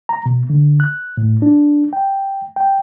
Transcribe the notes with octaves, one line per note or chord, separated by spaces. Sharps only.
A#5
B2
D3
F#6
A2
D4
G5
G5